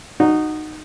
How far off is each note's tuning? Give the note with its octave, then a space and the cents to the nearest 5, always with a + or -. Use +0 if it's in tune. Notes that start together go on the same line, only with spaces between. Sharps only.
D#4 -15 F#4 +0